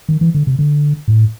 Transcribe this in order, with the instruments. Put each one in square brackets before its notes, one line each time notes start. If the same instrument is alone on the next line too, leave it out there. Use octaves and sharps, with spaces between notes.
[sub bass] D#3
E3
D3
C3
D3
A2